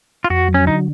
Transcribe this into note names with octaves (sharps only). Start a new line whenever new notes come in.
F4
F2 F#4
F#3
C#4
D3 D#4